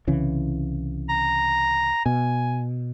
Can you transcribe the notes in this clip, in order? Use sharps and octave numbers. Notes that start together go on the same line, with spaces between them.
C2 C#3 E3
A#5
B2 G#5